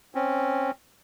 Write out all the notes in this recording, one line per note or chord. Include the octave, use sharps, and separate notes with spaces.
C4 C#4